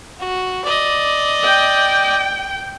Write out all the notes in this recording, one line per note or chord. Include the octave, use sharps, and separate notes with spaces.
F#4
D5 D#5
G5